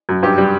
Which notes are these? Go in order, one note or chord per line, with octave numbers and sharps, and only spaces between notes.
F#2
G2 G4
G3